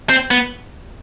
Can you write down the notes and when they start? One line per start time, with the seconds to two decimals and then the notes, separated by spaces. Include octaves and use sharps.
0.09 C4
0.31 B3